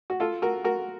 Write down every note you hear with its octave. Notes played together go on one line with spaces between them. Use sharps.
F#4
F4 A4
F#4 A#4
F#4 A#4